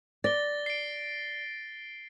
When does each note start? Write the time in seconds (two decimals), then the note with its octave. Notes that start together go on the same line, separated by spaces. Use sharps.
0.24 D5 A6 A#6 G7
0.66 C7 D7